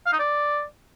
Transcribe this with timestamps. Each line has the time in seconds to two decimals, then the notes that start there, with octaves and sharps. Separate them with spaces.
0.06 F5
0.13 D#4
0.19 D5